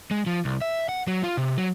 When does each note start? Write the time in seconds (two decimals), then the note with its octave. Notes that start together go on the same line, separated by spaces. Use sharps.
0.11 G#3
0.26 F3
0.45 C2
0.61 E5
0.89 F#5
1.08 F#3
1.23 F4
1.37 C3
1.58 F#3